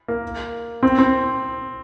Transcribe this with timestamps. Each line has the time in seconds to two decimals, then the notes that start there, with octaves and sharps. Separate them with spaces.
0.08 A#3
0.83 C4
0.98 C4